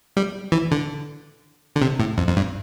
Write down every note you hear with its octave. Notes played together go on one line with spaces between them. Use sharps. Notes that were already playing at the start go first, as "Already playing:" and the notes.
G3
E3
D3
D3
C3
A2
F2
F2
G2